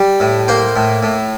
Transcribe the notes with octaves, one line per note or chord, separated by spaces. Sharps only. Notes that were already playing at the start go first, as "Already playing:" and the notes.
Already playing: G3
A2
A#3 C5
A2
A2